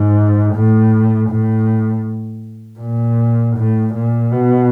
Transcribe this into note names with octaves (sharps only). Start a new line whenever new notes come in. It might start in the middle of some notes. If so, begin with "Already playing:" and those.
Already playing: G#2
A2
A2
A#2
A2
A#2
B2